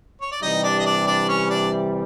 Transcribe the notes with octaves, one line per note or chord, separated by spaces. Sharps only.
C#5
D5
C3 E3 G3 D#4 D#5
D4 D5
D#5
D4 D5
D4 D5
C#4 C#5
D4 D5